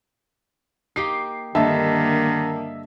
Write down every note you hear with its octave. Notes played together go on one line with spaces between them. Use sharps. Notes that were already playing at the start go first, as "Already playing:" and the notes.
A#3 D#4 G4 C7
G2 D3 D#3 A#3 A4 D#5 E5 A5